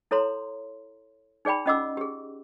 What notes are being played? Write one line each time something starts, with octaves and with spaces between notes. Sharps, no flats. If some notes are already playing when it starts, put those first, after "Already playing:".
E4 A4 C#5 A#5 C6
D#4 G#4 D5 G5 B5
C#4 F4 D#5 F#5 D6 E6
G4 G#4